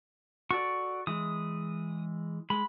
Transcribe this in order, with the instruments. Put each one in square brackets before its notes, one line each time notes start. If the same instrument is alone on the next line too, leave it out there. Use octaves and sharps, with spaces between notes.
[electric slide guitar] F#4 A4 D5 [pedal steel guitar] C#6
[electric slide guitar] E3 G#3 [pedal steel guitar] D#6
[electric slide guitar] G#3 [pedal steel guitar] B5